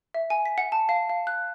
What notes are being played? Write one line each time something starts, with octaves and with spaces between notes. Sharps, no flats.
E5
G#5
B6
F#5
A5
F5
F5
F#6